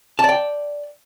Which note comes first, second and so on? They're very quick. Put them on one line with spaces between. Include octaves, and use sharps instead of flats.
A5 D5 G5